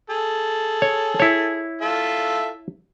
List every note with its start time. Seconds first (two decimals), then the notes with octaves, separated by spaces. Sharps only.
0.10 G#4 A4
0.82 C#5
1.20 E4 C#5
1.81 F4 A4 E5